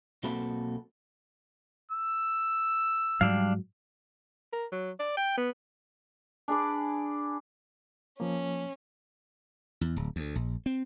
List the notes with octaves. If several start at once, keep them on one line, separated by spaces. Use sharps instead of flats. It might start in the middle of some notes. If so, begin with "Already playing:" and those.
B1 A#3 C4 F#4 A4 B5
E6
G#2 F#3 G3 D4 F5
A#4
F#3
D5
G5
B3
D4 G#4 B4 D5
F3 A#3 C#4
E2
D1
D2
A#1
C4